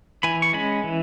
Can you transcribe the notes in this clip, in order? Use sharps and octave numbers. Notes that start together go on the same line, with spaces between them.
E3 G#5 B5
C#6
G#3 C#4 G#5 B5
E3